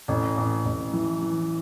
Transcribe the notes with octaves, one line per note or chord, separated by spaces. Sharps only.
A1
A1
A1
E3
E3